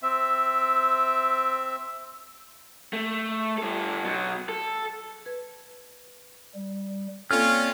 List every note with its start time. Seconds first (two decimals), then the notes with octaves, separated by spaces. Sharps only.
0.02 C4 E5
2.93 A3
3.58 G2 A4
4.05 B2 F#3
4.49 A4
5.26 B4 G#6
6.55 G3
7.31 A#3 C4 C#4 F4 A4 D5 F6